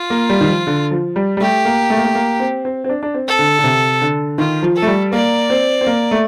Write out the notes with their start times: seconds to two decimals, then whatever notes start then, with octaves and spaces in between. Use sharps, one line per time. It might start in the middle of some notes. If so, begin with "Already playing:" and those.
Already playing: F4
0.10 A#3
0.30 G3
0.41 D#3
0.48 F3
0.67 D3
0.91 F3
1.16 G3
1.37 G3
1.40 A3 G4
1.65 A#3
1.90 A3
1.97 A#3
2.05 A3
2.15 A#3
2.40 C4
2.65 C4
2.84 C4
2.89 D4
3.03 D4
3.14 C4
3.27 A4
3.39 D3
3.59 D3
3.64 C3
4.02 D3
4.38 D#3 F4
4.63 F3
4.76 A4
4.82 A3
4.87 G3
5.13 A#3 D5
5.50 C4
5.81 C4
5.87 A#3
6.11 A3